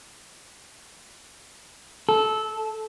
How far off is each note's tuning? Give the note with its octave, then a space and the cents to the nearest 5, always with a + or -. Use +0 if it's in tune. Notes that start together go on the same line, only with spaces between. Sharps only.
A4 -15